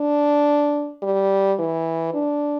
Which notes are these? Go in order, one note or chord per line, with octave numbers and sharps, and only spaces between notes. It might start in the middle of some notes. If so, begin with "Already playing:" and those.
Already playing: D4
G3
E3
D4